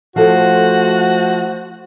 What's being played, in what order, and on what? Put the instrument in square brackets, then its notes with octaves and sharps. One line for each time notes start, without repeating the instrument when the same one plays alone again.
[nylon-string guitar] F3 A4 [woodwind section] A3 C5 [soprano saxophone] F#4